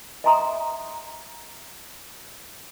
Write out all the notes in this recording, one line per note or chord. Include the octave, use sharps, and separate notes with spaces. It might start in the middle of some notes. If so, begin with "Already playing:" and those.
D#5 E5 G#5 A#5 C6 D#6